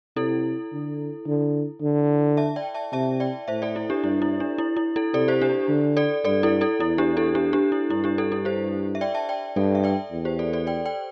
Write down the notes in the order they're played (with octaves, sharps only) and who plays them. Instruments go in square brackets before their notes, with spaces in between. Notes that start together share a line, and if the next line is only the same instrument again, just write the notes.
[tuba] C3 [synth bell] E4 A4
[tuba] D3
D3
D3
[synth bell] E5 A5
D5 G5
E5 A5
[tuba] C3 [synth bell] E5 A5
[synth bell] D5 G5
[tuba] A2 [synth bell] C5 E5
[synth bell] A4 D5
E4
D4 G4
[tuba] G2 [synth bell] E4
[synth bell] E4
D4
E4
E4
E4 A4
[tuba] C3 [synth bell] A4 D5
[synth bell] G4 C5
D4 G4
[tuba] D3
[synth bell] A4 D5
[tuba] G2 [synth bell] A4 D5
[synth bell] E4 A4
E4 A4
[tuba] E2 [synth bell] E4
[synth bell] D4 G4
E4 A4
D4 G4
D4 G4
E4
[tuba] G2 [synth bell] E4
[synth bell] D4 G4
E4 A4
E4 A4
G4 C5
E5
D5 G5
E5 A5
D5 G5
[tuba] G2 [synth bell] A4 D5
[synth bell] E5
D5 G5
[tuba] E2
[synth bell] G4 C5
A4 D5
A4 D5
D5 G5
D5 G5